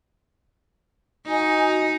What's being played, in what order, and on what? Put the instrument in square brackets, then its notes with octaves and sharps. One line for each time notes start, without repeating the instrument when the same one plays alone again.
[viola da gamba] D#4 [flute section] F#4 D#5 G#5